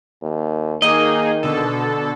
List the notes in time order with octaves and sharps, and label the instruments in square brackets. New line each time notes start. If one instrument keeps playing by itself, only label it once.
[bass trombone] D#2
[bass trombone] D#3 [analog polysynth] A#3 D#4 G#4 [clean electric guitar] D#5
[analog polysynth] B2 D3 A4